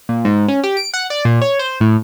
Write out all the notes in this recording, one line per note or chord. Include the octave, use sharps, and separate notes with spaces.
A#2
G#2
C#4
G4
D7
F#5
D5
A#2
C#5
C5
A2